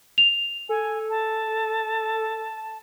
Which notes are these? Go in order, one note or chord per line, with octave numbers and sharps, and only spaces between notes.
F7
A4 G#5
A5